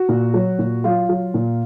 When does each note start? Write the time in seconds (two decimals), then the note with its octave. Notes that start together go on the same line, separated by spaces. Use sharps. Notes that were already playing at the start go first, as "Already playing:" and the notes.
Already playing: F#4
0.09 A#2
0.34 F#3
0.59 A#2
0.84 F#3 F4
1.09 F#3
1.34 A#2